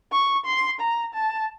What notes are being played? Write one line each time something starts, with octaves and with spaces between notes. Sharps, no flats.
C#6
C6
A#5
A5